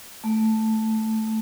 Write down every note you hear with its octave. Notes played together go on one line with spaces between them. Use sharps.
A3